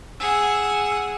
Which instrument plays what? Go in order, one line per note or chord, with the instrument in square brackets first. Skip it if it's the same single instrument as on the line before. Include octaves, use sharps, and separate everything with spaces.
[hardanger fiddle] G#4 F#5 [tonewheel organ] E6